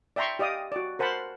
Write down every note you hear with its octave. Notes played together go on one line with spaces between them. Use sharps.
D5 E5 G5 A#5 C6 C#6
G4 D5 D#5 F5 D#6
F#4 D5
A#4 C5 F#5 A5 B5 C6